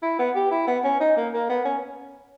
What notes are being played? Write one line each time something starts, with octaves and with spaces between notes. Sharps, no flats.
E4
B3
G4
E4
B3
C#4
D#4
A#3
A#3
B3
C#4